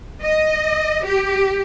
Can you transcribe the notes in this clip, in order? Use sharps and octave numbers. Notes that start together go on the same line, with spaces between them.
D#5
G4